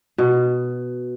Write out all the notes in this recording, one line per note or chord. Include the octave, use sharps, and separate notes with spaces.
B2